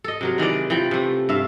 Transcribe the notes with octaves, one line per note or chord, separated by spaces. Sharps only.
A4 D#5
C3 F#3 A#4
D#3 E3 G#3 D5
E3 F3 G5
C3 A3
G2 E5 F5